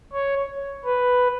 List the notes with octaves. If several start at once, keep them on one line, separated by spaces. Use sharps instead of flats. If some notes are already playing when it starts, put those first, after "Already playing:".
C#5
B4